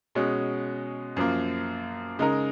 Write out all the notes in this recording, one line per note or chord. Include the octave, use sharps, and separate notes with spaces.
B2 G#3 C#4
F#2 F3 A#3
C#3 G#3 D#4 A#4